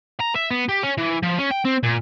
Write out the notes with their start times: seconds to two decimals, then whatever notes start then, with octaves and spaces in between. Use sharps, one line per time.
0.20 A#5
0.36 E5
0.51 B3
0.69 G4
0.83 C#4
0.98 E3
1.23 F3
1.38 C#4
1.50 G5
1.65 C4
1.83 A#2